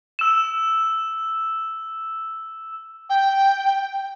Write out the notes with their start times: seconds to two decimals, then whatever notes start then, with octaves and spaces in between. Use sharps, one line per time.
0.19 E6 E7
3.10 G5